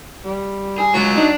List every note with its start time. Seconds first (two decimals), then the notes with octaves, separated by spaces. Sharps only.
0.25 G3
0.78 G#4
0.94 F#3 G#3 F4
1.16 D4 D#4